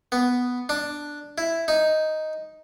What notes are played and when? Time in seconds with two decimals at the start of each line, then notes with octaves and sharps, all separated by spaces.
0.12 B3
0.69 D4
1.38 E4
1.68 D#4